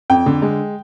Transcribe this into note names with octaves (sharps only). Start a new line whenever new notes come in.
F2 G5
D3
G#3